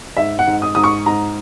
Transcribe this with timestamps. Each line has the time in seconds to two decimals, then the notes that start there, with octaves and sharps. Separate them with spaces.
0.17 G#2 E5
0.39 F#5
0.47 G#2
0.62 D#6
0.75 G#2 D#6
0.84 C#6
1.06 G#2 A#5